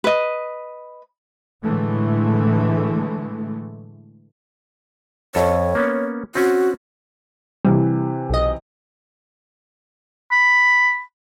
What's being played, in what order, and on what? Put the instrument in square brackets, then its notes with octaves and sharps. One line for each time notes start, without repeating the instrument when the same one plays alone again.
[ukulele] B4 D#5
[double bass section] A2 D3 E3 G#3 A3
[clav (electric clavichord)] F2 A4 [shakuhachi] C#5
[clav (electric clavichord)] A#3 B3 C#4
[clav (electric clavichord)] C4 C#4 [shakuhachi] F#4
[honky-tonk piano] C3 E3 [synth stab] G3
[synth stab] B1 D#5
[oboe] B5